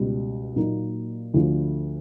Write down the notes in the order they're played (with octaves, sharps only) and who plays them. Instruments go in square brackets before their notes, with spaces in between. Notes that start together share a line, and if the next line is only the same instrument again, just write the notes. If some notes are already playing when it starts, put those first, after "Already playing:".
Already playing: [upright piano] C#2 B2 G3
A#2 F#3 A#3 D#4
D2 D3 F3